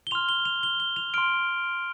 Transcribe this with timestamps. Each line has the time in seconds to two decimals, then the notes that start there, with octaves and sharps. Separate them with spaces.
0.07 G7
0.11 C6 F6 F7
0.29 G7
0.45 F7
0.63 G7
0.80 G7
0.96 F7
1.14 C6 F6 D7